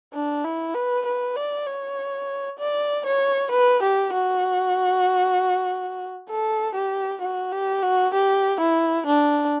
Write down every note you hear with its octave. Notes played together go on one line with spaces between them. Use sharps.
D4
E4
B4
B4
D5
C#5
D5
C#5
B4
G4
F#4
A4
G4
F#4
G4
F#4
G4
E4
D4